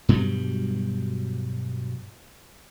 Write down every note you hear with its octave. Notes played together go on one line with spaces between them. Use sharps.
G2 B2 F#3 G3